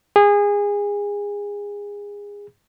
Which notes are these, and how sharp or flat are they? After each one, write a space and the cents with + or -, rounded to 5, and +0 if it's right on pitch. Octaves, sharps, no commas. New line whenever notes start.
G#4 -25